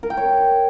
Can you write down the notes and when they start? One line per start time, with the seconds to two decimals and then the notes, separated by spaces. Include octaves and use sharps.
0.03 A#4
0.10 G5
0.17 C#5